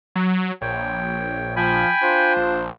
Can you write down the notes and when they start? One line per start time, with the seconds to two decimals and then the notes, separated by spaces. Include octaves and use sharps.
0.15 F#3
0.61 A#1 C#5 G5
1.56 F3 G5 G#5 B5
2.01 D4 F4 C5
2.37 A#1